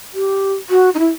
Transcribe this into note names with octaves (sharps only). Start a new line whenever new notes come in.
G4
F#4
D#4
E4